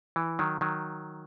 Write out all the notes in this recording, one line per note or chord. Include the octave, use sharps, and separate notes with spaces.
E3
D#3 F#3
D#3 F#3